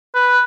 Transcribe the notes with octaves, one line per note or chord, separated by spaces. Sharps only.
B4